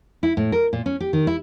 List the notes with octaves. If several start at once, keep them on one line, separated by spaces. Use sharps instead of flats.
E4
A2
A#4
A#2
C#4
G4
D#3
E4